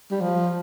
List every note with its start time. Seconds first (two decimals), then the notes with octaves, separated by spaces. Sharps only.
0.11 G3
0.21 F3